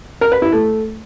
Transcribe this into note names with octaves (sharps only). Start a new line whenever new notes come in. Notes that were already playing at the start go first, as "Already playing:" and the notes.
A#4
B4
E4
A3